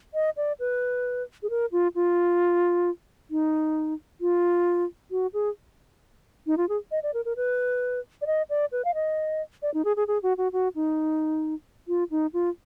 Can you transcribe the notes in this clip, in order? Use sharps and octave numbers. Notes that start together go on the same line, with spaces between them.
D#5
D5
B4
G#4
A#4
F4
F4
D#4
F4
F#4
G#4
D#4
F4
G#4
D#5
D5
A#4
A#4
B4
D5
D#5
D5
B4
F5
D#5
D5
D#4
G#4
G#4
G#4
F#4
F#4
F#4
D#4
F4
D#4
F4